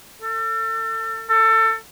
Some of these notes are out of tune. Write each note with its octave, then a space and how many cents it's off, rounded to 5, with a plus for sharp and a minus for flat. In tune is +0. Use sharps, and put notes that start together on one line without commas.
A4 +35
A4 +25